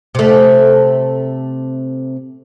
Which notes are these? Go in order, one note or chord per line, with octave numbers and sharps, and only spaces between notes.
C3 A3